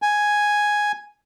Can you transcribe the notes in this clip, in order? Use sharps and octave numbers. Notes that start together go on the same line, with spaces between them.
G#5